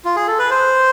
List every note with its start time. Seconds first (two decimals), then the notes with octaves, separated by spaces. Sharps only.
0.05 F4
0.16 G#4
0.27 A4
0.39 B4
0.50 C5